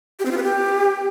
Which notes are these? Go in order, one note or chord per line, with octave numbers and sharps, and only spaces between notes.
G4
C4
F4
B4
G4